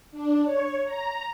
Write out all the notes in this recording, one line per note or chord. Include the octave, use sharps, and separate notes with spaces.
D4
C#5
A#5